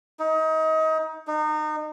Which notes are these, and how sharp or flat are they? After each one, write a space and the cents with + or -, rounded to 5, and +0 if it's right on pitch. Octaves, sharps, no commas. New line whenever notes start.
D#4 +30
D#4 -30